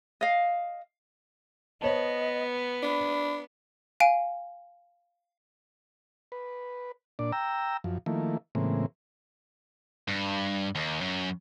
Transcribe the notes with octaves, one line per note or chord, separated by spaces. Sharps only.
D#5 F5
B3 C5 C#5 D#5 A5
D4 B5
F5 G#5 D7
B4
A#2 D4 D5
G5 A#5 E6
F#2 F3
D#3 F3 A3 A#3 E4
A2 C#3 E3 G#3 A#3 C4
G2
D#2
F#2